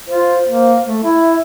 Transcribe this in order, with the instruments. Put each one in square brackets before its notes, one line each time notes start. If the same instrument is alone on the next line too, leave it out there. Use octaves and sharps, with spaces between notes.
[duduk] F4 [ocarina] C5
[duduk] A#3
A3
[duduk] E4 [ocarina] E5